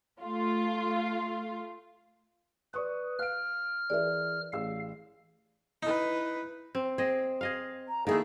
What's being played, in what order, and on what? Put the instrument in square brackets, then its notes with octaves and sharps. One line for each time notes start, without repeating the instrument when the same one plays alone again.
[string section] A3 F4 F5
[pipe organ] B4 [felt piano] D5 C#6 D#6
[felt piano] F5 D7 [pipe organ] F6
[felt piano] E3 G#4 A#4 [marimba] D5 E5
[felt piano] A1 G#4 E6 [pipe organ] F5
[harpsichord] D#4 [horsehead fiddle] E4 B4
[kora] C4
[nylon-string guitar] C4 [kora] G#4 D#5
[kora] G#4 D#5 F5
[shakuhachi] A#5
[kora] D#3 A3 [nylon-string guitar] A#3 E4 [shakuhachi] G#4